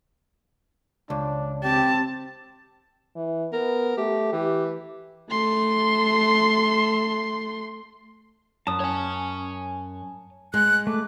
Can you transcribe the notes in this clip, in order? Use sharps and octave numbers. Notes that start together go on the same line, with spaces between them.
C#2 D4
C4 G4 A5
E3
B3 A#4
A3 G4
E3 G4
A3 C6
F#2 A5 D#6
C#5 G#5
G#3 F#6
A3 D6